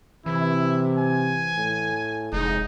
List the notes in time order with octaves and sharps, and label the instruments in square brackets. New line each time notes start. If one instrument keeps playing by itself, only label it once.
[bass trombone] C3 [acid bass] E3 [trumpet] E4
[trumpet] G#5
[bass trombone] A2
[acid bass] F1 [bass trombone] G#3 [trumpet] D#4